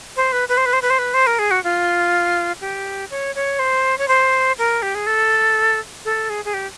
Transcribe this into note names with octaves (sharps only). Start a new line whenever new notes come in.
C5
B4
B4
C5
B4
C5
B4
C5
B4
C5
A#4
G#4
F#4
F4
G4
C#5
C#5
C5
C#5
C5
A#4
G4
G#4
A4
A4
G#4
G#4
G4